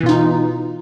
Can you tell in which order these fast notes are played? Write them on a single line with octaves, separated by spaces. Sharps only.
E3 B2 F4 D#4